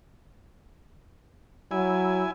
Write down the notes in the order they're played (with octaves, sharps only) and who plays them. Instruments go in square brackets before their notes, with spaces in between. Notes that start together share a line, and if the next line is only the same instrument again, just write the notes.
[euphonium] F#3 [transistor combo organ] E4 G#5